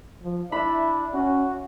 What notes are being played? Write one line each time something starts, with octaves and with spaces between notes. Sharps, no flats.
F3
D4 E4 E5 B5
C#4 F#4